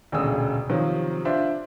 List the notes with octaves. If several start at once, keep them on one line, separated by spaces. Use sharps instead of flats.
E1 D2 A#2 C#3 D#6 E6
C3 D#3 F3 F#3
D4 F4 C5 E5